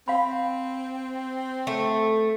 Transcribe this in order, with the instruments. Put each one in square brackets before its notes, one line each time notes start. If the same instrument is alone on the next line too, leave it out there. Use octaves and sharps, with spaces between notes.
[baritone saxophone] C4 [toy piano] F5 B5
[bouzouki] A3